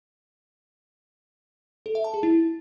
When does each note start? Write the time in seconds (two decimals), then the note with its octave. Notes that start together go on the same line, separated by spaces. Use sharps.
1.86 A4
1.95 E5
2.04 A5
2.14 G#4
2.23 E4